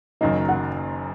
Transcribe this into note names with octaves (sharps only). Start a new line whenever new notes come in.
F#1 F#2 D#3 F#3 A#3 D#5
F#5